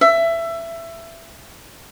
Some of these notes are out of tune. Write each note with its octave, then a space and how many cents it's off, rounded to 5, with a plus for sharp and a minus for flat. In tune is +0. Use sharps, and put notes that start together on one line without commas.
E5 +20